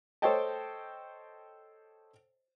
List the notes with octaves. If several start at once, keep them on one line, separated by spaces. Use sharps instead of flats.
A4 C5 C#5 D#5 G5 A5